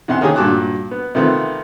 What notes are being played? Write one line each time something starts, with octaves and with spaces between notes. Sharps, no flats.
E2 C3 F#5 C6
D#3 A#3 C#4 G4 G#4 D#6
G2 A#2 F#4 A5 D6 F#6
B3
C3 D#3 F3 A3 B3 C4